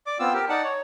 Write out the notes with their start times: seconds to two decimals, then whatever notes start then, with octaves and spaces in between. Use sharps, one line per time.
0.07 D5 D6
0.19 B3 C4 F4 E6
0.34 G4 A#4
0.49 D#4 D5 F#5 A5
0.64 C#5